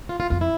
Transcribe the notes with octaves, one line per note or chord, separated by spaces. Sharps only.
F4
F4
F2 F4
E4